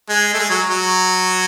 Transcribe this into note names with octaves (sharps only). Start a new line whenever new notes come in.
G#3
A3
G#3
F#3
F#3